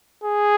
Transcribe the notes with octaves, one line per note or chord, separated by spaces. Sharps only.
G#4